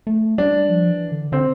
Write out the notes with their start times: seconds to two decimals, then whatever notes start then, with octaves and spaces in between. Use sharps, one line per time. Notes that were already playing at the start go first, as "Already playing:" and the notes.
0.07 A3
0.38 G3 D4
0.69 F3
0.90 E3
1.11 D3
1.32 D3 C4